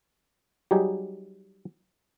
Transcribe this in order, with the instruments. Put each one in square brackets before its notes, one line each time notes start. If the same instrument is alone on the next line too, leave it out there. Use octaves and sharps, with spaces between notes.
[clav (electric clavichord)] F#3 G3 D#4 G4 G#4